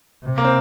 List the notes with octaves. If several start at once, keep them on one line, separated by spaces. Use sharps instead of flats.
C3
A#3
C4